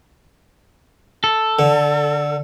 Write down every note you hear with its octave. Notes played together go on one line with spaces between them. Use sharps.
A4
D3